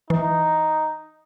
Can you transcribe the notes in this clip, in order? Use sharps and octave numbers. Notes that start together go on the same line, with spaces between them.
E3 D#4